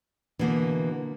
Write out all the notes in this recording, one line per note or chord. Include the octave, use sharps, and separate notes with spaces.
B2 D3 E3 A#3